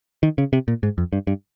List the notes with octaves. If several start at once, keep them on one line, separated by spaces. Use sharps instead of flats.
D#3
C#3
C3
A#2
G#2
F2
G2
G2